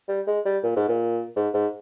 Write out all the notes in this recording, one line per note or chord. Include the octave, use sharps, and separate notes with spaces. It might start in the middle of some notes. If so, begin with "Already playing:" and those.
G3
G#3
G3
A#2
G#2
A#2
G#2
G#2